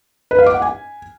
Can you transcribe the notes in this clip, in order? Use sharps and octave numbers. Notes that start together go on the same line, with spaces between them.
B4
F5
D6
F#5
G#5